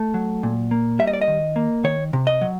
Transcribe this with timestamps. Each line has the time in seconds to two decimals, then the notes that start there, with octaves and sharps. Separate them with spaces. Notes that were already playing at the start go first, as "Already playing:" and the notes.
Already playing: A3
0.14 F#3
0.43 A#2
0.71 A#3
0.99 G3 E5
1.07 D#5
1.13 D5
1.22 D#5
1.28 D#3
1.56 A#3
1.84 D#3 C#5
2.13 C3
2.27 D#5
2.41 F#3